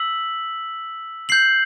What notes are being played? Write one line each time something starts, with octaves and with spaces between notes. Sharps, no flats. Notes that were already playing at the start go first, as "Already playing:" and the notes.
Already playing: E6 B6 F#7
G6 C7 F#7